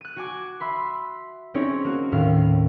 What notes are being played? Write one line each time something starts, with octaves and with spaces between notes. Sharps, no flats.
F#6 D#7
F#4 G#5 D6
E5 B5 C6
C4 C#4 D#4 E4 G#4 C#5
A#3 F#4
D#2 A2 F5